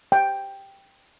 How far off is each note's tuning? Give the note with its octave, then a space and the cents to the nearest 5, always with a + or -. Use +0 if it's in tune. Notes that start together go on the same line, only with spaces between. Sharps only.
G5 +5